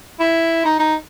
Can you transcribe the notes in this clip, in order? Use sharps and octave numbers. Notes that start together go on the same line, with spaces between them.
E4
D#4
D#4